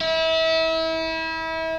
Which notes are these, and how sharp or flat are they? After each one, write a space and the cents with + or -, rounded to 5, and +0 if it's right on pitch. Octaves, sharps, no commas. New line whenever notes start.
E4 -30